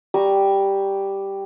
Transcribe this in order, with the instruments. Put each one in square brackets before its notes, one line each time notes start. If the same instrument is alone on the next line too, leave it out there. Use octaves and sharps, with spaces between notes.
[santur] G3 G4 A#5 C#6